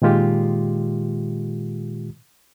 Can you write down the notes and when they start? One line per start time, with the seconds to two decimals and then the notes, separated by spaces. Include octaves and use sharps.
0.02 A#2 D#3 G#3 F4 G4